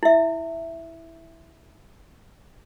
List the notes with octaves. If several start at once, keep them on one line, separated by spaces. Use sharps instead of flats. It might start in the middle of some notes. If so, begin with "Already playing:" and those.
E4 E5